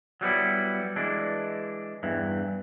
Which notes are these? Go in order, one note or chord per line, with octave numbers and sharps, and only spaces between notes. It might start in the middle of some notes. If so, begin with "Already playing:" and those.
F#3 G3 B3 E4
E3 G#3 D4
E2 G2 E3